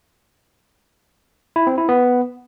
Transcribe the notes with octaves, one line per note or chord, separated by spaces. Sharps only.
E4
C4
E4
B3